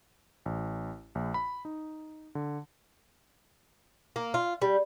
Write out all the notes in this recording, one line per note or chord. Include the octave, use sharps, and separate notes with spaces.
A1
A#1
B5
D#4
D3
A#3
F4
G3